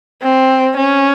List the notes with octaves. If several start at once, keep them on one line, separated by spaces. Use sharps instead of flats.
C4
C#4